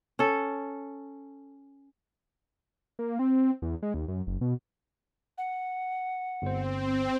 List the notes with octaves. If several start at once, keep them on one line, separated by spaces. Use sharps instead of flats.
C#4 A4
A#3
C4
E2
G#3
D#2
F#2
F#1
B2
F#5
G1 C4 C5